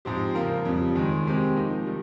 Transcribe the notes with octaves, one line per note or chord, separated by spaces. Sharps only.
G#2 F3 C4 G4 C5
C#3 F3 A#3 F4 A#4
F2 C#3 G3
D#2 D#3 G#3
C3 D#3 G#3 C4 G4
C3 F3 A#3 D#4
D#3 G3